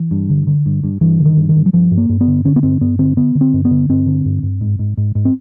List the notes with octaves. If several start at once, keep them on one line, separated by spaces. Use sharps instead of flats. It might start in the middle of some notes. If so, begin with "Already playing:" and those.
Already playing: E3
G2
D3
D3
G2
G2
G2 E3
D3
D#3
G2
D#3
G2
F#3
G2 F3
G2
A#3
G2
B3
D3
D3 C#4
B3
G2 C4
G2 B3
D3 C4
D3 B3
D3
C4
G2
B3
D3
G2 C4
D3
G2
G2
G#2
G#2
G#2
G#2
C4